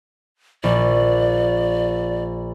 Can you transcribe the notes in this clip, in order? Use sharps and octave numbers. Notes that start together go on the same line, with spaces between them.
A#1 D5